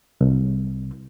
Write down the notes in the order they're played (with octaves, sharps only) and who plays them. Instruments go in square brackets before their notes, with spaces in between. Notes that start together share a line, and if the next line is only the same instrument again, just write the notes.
[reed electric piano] C2